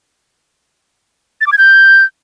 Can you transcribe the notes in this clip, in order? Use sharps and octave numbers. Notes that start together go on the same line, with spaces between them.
A6
D6
G#6
G6